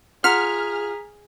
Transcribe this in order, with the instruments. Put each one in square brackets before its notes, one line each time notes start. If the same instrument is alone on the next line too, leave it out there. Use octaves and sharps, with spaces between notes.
[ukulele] F4 F#5 [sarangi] G#4 [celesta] A#5 B6 [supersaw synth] F6